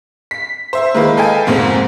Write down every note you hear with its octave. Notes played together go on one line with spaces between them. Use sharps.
B6
C5 E5
D#3 G#3 A#3 E4 B4
A4 B4 D#5 F5 G5 G#5
F2 G#2 B2 A#3 C4